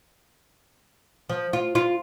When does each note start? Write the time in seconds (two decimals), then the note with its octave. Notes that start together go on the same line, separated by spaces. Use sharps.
1.29 F3
1.53 F4
1.75 F4